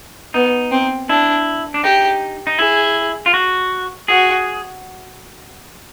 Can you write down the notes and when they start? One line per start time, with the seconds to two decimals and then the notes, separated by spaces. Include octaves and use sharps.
0.34 B3 D#4
0.72 C4
1.09 D4 E4
1.74 D4
1.84 D#4 G4
2.47 D#4
2.58 E4 G#4
3.26 F4
3.34 F#4
4.08 F#4 G#4